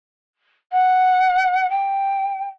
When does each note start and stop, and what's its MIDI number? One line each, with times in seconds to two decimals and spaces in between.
0.72 1.70 78
1.70 2.47 79